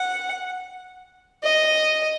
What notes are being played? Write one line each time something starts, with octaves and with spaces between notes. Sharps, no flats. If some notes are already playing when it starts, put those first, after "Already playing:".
Already playing: F#5
D#5